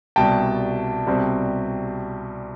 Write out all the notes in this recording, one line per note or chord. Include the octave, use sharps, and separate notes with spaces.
C2 B2 G3 G5 A5
C2 B2 G3 C4